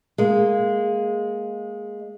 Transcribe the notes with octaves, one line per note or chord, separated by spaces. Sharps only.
G#3 A#3